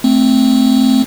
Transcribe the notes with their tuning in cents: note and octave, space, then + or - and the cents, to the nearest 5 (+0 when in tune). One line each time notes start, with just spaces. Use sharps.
A3 +0 C4 +0